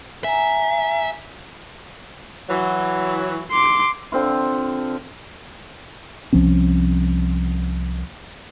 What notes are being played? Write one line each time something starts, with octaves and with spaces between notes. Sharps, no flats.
E5 G#5 A#5
E3 F#3
C6 D6
D3 C4 F4
C2 F3 C4 C#4